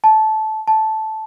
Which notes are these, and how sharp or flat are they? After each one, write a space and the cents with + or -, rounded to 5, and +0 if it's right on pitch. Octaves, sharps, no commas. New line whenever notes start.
A5 -15
A5 -10